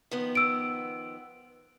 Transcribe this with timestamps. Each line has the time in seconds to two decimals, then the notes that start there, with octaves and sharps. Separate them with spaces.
0.11 D#3 F3 B3
0.35 E6 D7